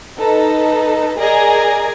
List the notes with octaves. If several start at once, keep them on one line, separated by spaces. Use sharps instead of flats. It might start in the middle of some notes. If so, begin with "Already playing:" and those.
D#4 A4 B4
G#4 A#4 D5 D#5 G#5 A#5